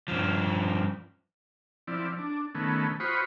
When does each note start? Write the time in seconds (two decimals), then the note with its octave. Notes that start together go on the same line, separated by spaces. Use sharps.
0.08 G2 F3
1.87 F3 C4 E4 D5
2.18 D4
2.55 D#3 A3 B3 C#4
3.00 F4 F#4 C5 B5 C#6 D#6